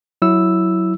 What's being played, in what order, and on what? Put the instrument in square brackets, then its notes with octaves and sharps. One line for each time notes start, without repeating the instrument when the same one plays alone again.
[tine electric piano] F#3 E4 E6